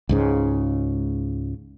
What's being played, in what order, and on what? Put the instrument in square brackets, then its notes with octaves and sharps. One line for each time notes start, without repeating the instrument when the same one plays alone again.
[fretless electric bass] C#2 G#2 C#3